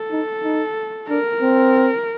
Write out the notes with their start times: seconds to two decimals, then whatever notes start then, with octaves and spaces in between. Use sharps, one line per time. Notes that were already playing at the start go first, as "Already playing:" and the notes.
Already playing: A4
0.11 D#4
0.43 D#4
1.09 D4 A#4
1.42 C4